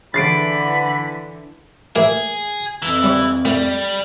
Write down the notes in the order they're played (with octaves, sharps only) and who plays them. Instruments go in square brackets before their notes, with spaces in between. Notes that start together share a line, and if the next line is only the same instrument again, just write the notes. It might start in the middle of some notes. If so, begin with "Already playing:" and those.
[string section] D3 E3 [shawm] B5 [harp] A6 C7 D7
[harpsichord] A1 A#3 E5 [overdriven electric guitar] G#4
[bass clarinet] F2 [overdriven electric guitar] E3 [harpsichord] A5
[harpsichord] G3 C#4
[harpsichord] A2 [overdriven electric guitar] G3